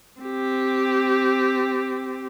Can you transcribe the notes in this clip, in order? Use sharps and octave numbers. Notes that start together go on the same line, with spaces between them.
C4 G4